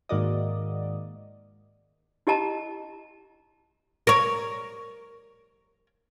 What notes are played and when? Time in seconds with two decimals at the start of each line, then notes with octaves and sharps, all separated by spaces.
0.09 G#2 D#3 A#3 F#4 D5 D#5
2.27 E4 G4 D#5 A5 A#5
4.07 A#4 C#5